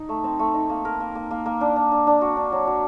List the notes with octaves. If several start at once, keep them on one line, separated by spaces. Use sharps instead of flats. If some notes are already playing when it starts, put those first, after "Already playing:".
Already playing: D#4
A3
C4
A3
D#4
A#3
A#4
A#3
A#3
A#3
A#3
D4
D4
D4
D4
F#4
D4
F#3
F#3